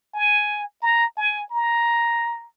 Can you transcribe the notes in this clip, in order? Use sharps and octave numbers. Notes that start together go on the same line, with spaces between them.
G#5
A#5
G#5
A#5